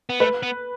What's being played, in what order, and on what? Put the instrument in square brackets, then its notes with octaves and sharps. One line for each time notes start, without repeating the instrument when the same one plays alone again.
[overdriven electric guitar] B3
[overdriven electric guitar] A3 [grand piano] B4
[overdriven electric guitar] B3